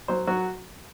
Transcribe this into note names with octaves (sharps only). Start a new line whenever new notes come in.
F#3 C5
F#3 F#4